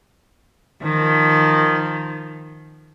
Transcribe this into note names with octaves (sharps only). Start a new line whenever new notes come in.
D#3 F3